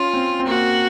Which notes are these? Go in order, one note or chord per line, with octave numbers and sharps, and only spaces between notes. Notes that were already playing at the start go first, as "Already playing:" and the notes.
Already playing: C#4 F4
C4
C4
A#3 F#4